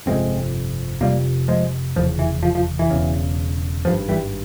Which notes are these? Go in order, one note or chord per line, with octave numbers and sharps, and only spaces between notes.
G1 F2 C3 G#3 C4
F1 F2 C3 G3 A#3
F3 G#3
F1 E2 C#3 F3
E3
F3
F3
E3
E1 E2 C#3
G#1 G2 F3
E3 G3